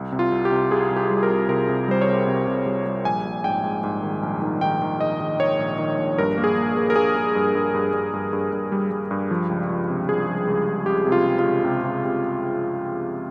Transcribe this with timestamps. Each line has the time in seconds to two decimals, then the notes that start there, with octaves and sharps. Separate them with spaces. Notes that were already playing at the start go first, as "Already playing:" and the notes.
Already playing: C2
0.12 C3
0.19 F4
0.32 C2
0.45 G4
0.51 C3
0.71 C2 G#4
0.91 C2
0.96 G4
1.11 G3
1.23 A#4
1.30 C2
1.49 C3 A#4
1.69 C3
1.88 G3 C5
2.01 C#5
2.08 C2
2.27 C3
2.47 C3
2.66 G3
2.86 G3
3.05 A#1 G#5
3.25 A#1
3.44 G#2 G5
3.63 G#2
3.84 G#2
4.03 D#3
4.23 A#1
4.42 D#3
4.61 D#3 G5
4.82 D#3
5.01 D#3 D#5
5.20 D#3
5.40 D#3 C#5
5.59 A#1
5.78 D#3
5.98 A#1
6.18 G2 A#4
6.38 A#3
6.44 G#4
6.57 A#3
6.77 A#3
6.90 A#4
6.96 A#3 G#4
7.16 A#3
7.35 G2
7.55 G2
7.74 G2
7.93 G2
8.13 G2
8.33 G2
8.53 G2
8.72 G3
8.91 G3
9.11 G2
9.31 F3
9.50 C#2
9.70 F3
9.89 C3
10.09 F3 G#4
10.28 F3
10.47 C#2
10.67 C#2
10.86 C#2 G4
11.07 C3
11.12 F4
11.26 C3
11.39 F4
11.45 C#2
11.65 C3
11.84 C3
12.04 C3